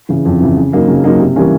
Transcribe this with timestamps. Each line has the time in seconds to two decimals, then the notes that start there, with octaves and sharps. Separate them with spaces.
0.09 C#3 E3
0.25 F2
0.41 C#3 E3
0.56 C#3
0.72 F#3 A#3 D#4
0.88 C#3
1.04 F#3 A#3 D#4
1.20 C3
1.36 E3 G3 A#3 C#4